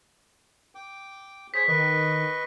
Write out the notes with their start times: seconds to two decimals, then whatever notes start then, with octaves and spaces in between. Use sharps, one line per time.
0.75 G5 D6
1.54 G#4 C5 C#5 B6
1.68 D#3 B4 D#5 C#6